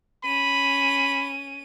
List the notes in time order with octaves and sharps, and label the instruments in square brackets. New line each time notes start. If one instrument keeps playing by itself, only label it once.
[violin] C#4 D#7 [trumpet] B5